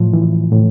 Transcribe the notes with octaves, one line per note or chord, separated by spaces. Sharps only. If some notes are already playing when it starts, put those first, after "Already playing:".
Already playing: A2 F3
E3
A2